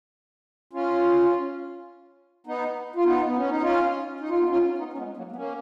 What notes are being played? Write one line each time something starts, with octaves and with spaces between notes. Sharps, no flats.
C#4 F4
B3 D#4
F4
B3 D#4
B3
C#4
D#4
C#4 F4
D#4
F4
B3 D#4
C#4 F4
B3 D#4
C#4
G#3 B3
F#3 A#3
B3
A#3 C#4